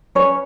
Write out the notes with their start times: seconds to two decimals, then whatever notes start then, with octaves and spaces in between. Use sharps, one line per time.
0.15 C#4 B4 C#5